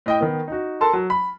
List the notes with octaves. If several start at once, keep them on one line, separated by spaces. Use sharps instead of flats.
A2 D#5 G5
D#3 B3
D#4 F#4
A4 A#4 A5 C6
F#3
B5